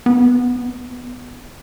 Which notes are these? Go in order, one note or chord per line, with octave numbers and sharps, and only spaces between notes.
B3